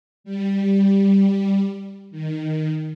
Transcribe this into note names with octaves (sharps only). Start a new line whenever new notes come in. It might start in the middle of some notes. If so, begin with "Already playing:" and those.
G3
D#3